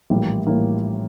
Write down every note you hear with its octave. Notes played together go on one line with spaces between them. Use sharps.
A#1 A2 E3 G3 A#3
A2 E3 G3 A#3